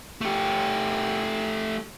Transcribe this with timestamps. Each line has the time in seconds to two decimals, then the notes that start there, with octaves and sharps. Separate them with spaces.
0.21 A3 G4